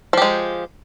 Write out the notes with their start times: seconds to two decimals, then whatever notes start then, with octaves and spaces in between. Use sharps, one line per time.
0.13 F3
0.17 G4
0.22 G#3